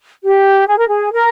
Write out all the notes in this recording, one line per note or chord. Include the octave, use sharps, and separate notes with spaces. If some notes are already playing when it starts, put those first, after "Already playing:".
G4
G#4
A#4
G#4
A#4